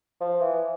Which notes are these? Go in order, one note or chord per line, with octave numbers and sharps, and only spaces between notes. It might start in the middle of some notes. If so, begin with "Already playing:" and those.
F3
E3